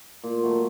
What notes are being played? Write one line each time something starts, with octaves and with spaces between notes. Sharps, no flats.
A#2
F#3 A3